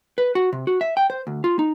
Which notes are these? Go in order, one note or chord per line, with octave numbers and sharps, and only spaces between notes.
B4
F#4
C3
F#4
E5
G5
C5
D2
F4
D#4